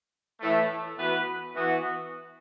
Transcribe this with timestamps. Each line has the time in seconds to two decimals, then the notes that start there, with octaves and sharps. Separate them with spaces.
0.41 A2 E3 A3
0.98 E3 B3 F#4 B4
1.56 E3 B3 F#4